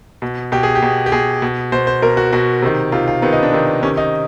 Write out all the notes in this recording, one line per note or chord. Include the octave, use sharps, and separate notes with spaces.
B2
B2 G4
G#4
G4
B2
G4
B2 G#4
B2
B2 C5
C5
B2 A#4
F#4
B2 F#4
C3 D#3
C3 D#3 F4
F4
C3 D#3 B3
D#4
D4
C3 D#3
C3 D#3 C#4
D#4